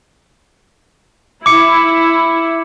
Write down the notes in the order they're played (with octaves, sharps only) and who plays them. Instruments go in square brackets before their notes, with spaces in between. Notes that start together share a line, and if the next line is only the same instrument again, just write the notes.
[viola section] E4 [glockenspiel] D6 C#7